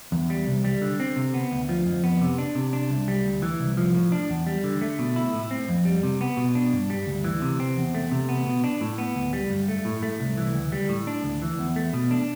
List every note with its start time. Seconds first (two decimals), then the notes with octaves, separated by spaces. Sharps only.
0.12 E2
0.30 G3
0.47 C2
0.65 G3
0.82 D3
1.00 C4
1.16 C3
1.34 B3
1.52 D2
1.69 F3
1.86 F2
2.04 B3
2.21 C3
2.38 D4
2.55 C3
2.73 D4
2.90 C2
3.08 G3
3.25 D2
3.42 E3
3.60 C2
3.77 F3
3.95 A2
4.12 D4
4.30 E2
4.47 G3
4.64 D3
4.81 A3
4.99 B2
5.16 E4
5.34 A2
5.51 C4
5.69 F2
5.85 G3
6.03 C3
6.21 B3
6.37 B2
6.55 D4
6.72 G2
6.90 G3
7.07 D2
7.24 E3
7.42 C3
7.60 C4
7.77 E2
7.94 A3
8.11 C3
8.29 B3
8.46 B2
8.64 D4
8.81 A2
8.98 B3
9.16 D2
9.33 G3
9.50 G2
9.68 A3
9.85 A2
10.03 A3
10.20 C2
10.37 E3
10.54 D2
10.72 G3
10.89 A2
11.07 D4
11.24 D2
11.42 E3
11.59 E2
11.76 A3
11.93 B2
12.11 D4